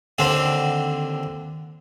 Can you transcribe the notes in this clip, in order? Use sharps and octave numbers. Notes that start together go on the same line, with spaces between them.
D#2 D3 C4